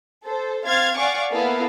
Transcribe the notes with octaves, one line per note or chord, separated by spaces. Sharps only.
A4 C5
C4 F5 C6 F6 G#6 A6
D5 F5 F#5 G#5 C#6 D6
A#3 B3 E4 A4 F5